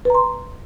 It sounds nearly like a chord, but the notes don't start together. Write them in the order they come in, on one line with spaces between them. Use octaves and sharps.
B4 A#5 C6